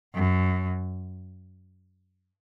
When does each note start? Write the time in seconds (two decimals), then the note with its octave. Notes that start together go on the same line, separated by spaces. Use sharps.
0.15 F#2